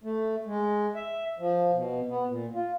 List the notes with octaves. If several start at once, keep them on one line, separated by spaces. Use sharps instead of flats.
A3
G#3
E5
F3
B2
B3
A#2
F4